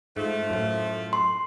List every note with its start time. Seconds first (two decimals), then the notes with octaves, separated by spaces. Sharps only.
0.17 G#2 F3 A3
0.50 F#2 A2
1.13 C6